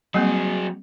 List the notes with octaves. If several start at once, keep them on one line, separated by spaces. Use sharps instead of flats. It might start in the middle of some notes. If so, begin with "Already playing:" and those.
F#3 G3 A#3 C4 G#4